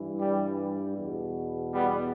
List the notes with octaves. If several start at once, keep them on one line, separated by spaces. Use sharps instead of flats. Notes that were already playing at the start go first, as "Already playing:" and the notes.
Already playing: G2 E3
G3
E2 B2
G3 B3